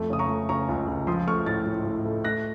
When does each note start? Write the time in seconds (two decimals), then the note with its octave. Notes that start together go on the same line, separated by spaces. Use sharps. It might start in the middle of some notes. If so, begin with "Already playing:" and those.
Already playing: F2 A3
0.10 C#3 D#6
0.19 A#5 C#6
0.29 A3
0.49 C#3 A#5 C#6
0.69 C#2
0.88 C#2
1.07 F3 C6 D#6
1.27 A3 C#6 F6
1.46 A2 F6 A6
1.66 A2
1.86 A2
2.05 A3
2.24 A3 F#6 A#6